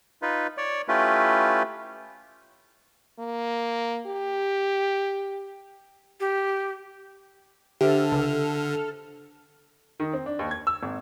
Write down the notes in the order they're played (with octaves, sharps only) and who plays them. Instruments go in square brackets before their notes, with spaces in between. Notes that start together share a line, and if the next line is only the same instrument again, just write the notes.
[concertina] D#4 F4 B4
C#5 D5
A3 C#4 E4 F4 G4 B4
[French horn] A#3
G4
[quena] G4
[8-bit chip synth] D3 [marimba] D4 C5 E5 [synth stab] G4 [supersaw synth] A4 F6
[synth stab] C#2
[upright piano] D#3
C4
D4
D#2
G#6
E6
G#1